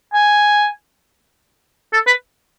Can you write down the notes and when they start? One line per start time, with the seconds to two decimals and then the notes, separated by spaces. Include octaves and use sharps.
0.14 G#5
1.93 A4
2.07 B4